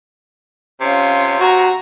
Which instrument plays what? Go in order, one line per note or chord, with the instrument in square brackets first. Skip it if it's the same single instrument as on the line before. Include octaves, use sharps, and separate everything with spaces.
[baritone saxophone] C3 [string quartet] C#4 F4
[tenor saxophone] F#4 [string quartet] A#5 G#6